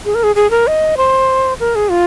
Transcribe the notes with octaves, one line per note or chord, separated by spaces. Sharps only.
G#4
A#4
G#4
G#4
A#4
D#5
C5
A#4
G#4
F4